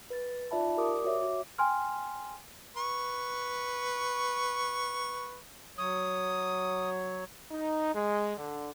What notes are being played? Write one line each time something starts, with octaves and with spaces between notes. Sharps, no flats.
B4 A6
D#4 F4 D5 E5 A5 B5
G4 A#4 D5 D6 D#6
F#4 C#5 E5 D6
F#4
G5 G#5 C6 F6
B4 C#6
F#3 C#5 D#6
D#4
G#3
D3